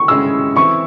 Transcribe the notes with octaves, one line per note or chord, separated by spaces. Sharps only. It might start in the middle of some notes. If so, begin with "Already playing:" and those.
Already playing: C#6
C#3 G#3 C#4 E4 G#4 E6
E3 C4 E4 C#6